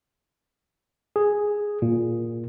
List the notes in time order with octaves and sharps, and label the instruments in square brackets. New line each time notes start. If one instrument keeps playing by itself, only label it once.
[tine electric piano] G#4
A#2